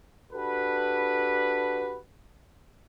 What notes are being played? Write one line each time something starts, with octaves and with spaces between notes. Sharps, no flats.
D4 F#4 G4 A4 B4